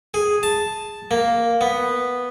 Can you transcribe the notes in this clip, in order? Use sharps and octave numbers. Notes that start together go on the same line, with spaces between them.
G#4
A5
A#3
B3